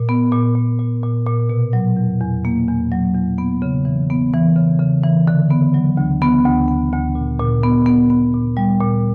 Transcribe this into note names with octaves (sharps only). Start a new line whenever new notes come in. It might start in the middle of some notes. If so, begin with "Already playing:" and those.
Already playing: A#2
B3
A#2
A#2
A#2
A#2
A#2
B2
F#3
E2
E2
A#3
E2
F#3
E2
B3
C#3
E3
B3
E3
C#3
C#3
E3
D3
B3
F#3
D2
B3
D2
B3
D2
A#2
A#2
B3
B3
B3
A#2
G3
A#2